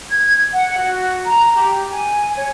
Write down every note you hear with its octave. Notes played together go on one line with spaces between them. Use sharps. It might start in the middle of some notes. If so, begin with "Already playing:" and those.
G#6
F#5
F#4
A#5
G4
G#5
C#5